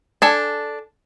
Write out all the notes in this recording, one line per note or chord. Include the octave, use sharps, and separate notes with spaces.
D4 A4 G#5